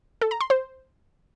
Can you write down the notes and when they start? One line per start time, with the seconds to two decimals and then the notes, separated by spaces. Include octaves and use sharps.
0.21 A4
0.31 A#5
0.41 C6
0.50 C5